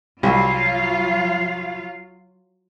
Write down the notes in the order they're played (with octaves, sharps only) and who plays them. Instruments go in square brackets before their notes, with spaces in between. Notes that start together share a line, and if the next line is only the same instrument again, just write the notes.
[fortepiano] C2 [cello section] F#3 F4 F5